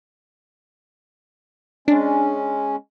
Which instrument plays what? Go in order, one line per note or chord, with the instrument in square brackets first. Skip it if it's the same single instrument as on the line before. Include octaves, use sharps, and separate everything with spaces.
[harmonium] G#3 C#4 [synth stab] D4